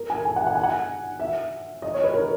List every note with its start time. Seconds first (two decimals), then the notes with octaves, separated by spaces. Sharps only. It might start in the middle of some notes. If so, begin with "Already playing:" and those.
Already playing: A#4
0.10 G#5
0.25 G#5
0.36 F#5
0.47 F#5
0.55 G#5
0.63 F#5
1.20 E5
1.82 D#5
1.94 C#5
2.04 B4
2.14 A#4